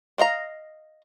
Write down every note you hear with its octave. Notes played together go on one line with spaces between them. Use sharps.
D4 D#5 F5 A#5